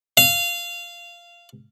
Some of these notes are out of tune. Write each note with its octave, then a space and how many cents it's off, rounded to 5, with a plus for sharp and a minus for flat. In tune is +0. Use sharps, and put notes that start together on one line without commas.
F5 -15